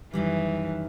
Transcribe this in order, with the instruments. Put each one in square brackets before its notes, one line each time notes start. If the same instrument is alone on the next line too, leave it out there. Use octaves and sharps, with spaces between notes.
[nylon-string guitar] F#2 D#3 G3 [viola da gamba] E3